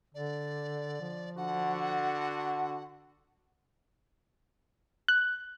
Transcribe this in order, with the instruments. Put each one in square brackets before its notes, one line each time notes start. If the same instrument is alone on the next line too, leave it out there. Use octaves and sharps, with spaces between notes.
[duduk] D3 [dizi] D5
[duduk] F3
[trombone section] D3 F#4 [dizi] F#5
[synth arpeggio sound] F#6